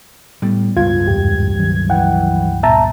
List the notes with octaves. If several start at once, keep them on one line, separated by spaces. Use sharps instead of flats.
A2 G3 B3
C#2 G2 F4 G#6
E2 G#2 E3 G4
D#3 F#3 C#4
E3 F#5 G5
A#2 B3 E5 A5 A#5